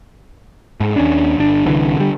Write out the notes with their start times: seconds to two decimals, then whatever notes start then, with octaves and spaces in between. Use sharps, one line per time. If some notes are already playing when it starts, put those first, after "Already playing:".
0.80 G#2
0.96 D#2 C#4 D4
1.38 G1 D4
1.66 C2 D3 E3
1.97 D3 G3